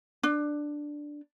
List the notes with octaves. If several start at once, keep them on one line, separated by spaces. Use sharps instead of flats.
D4